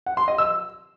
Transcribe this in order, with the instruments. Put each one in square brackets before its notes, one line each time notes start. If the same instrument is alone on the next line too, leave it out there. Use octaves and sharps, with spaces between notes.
[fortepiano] F#5
C6
D#5
E6